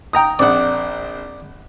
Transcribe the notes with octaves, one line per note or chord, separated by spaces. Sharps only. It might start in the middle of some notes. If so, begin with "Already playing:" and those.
G5 A#5 D#6
A#1 C4 D5 F#5